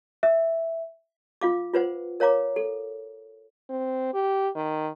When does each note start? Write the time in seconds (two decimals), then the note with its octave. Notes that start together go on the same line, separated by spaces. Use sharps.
0.23 E5
1.41 F4 F5 D6
1.74 F4 B4 C5 F#5
2.20 A#4 C#5 F5 A#5 D6
2.56 A4
3.70 C4
4.14 G4
4.56 D#3